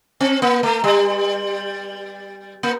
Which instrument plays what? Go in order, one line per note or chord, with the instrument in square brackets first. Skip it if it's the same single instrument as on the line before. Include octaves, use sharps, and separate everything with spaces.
[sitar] C4
A#3
A3
G3
A#3